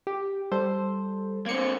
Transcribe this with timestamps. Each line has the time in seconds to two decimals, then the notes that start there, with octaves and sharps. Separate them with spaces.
0.07 G4
0.52 G3 A4 C5
1.46 A#3 C4 G#6 C#7